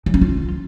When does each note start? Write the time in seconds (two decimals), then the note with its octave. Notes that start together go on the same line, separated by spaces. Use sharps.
0.06 F#3
0.14 C#4
0.21 F4